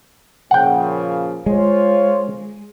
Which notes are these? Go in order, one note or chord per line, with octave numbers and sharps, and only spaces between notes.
A#2 C#3 F3 F#5 G5
G#3 F4 C5 C#5